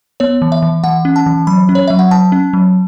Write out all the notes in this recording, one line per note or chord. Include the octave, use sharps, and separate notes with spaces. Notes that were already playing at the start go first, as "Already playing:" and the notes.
B3 C#5
E3
E5
E3
E3 F#5
C#4
A5
E3
F#3 B5
C#4
C#5
F#3 E5
F#5
F#3 A5
C#4
F#3